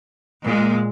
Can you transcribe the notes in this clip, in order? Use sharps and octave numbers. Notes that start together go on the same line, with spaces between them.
A#2 G#3